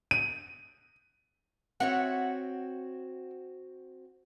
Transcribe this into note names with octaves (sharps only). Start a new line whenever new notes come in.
D#7
C4 F#4 C#5 E5 F#5